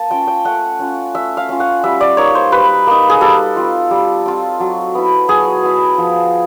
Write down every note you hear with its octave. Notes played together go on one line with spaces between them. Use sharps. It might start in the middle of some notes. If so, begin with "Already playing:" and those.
Already playing: A#3 A5
C#4 F4 G5
G5
A3 F#5
C#4 F4
A3 E5
F5
C#4 F4
F#5
G3 E5
D5
A#3 D#4 C#5
C5
G3 B4
A#3 D#4
G#4
G3 A4
C4 F4
G3
C4 F4
F#3
B3 E4
F#3 G#4
B3 E4
F3